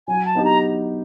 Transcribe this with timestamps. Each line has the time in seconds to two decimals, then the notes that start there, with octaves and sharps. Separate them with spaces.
0.08 F#3 G#5
0.25 A5
0.35 B3 D#4 G4
0.45 A#5